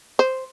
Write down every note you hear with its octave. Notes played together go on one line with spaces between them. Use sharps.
C5